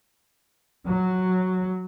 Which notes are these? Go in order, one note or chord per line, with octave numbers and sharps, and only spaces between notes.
F#3